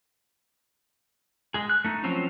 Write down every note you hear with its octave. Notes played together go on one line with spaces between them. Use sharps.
G#3 G#4
F#6
A3 D#4
F3 F#3 C4 C#4